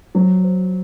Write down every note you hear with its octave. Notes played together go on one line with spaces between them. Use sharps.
F#3 C5
C5